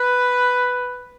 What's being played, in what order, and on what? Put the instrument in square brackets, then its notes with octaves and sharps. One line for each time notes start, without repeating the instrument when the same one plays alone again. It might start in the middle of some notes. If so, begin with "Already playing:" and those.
Already playing: [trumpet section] B4